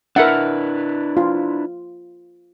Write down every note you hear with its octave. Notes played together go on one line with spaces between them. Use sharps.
D4 E4 A#4 B4 E5 F#5
F4